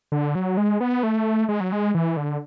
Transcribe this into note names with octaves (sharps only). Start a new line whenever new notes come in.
D3
F#3
G#3
B3
A3
G#3
F#3
G#3
E3
D3